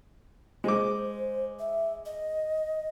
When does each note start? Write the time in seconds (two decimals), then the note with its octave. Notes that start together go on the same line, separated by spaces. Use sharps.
0.64 G#3 C5 D6
1.59 E5
2.06 D#5